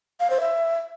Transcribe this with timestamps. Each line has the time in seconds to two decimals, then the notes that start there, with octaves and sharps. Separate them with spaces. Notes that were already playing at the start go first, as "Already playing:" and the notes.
0.20 F5
0.30 C5
0.40 E5